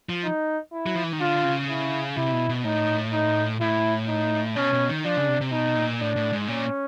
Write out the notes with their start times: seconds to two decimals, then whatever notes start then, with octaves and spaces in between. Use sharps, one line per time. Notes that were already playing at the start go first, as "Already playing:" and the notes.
0.09 F3
0.24 D#4
0.73 E4
0.86 F#3
0.95 F3
1.04 E3
1.13 D#3
1.20 D3 F4
1.44 C#3
1.69 E4
2.17 C3 E4
2.33 B2
2.49 B2
2.64 A2 D#4
3.13 D#4
3.61 A2 E4
4.08 D#4
4.56 B2 C#4
4.73 B2
4.89 D#3
5.05 F3 D4
5.17 C#3
5.28 C3
5.41 C3
5.52 B2 D#4
5.76 A#2
6.00 A2 D4
6.16 A2
6.33 G#2
6.48 A#2 C#4